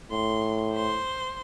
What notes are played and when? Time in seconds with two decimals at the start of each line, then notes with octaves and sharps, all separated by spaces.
0.11 A2 C6
0.73 C5 C6